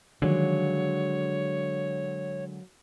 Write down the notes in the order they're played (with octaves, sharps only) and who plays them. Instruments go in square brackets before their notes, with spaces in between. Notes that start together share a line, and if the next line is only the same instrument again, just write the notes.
[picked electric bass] D3 G#3 [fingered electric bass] D#3 F3 [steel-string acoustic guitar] F#3 A#3 [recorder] C#5